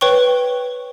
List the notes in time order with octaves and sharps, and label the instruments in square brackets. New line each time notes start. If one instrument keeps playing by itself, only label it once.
[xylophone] B4 C#5 G5 C#6 G7